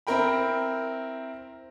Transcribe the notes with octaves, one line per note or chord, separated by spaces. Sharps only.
C4 E4 A#4 G5 B5